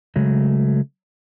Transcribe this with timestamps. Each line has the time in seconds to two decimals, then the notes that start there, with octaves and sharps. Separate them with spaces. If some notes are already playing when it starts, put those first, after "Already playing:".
0.16 C#3 F#3 G#3 A3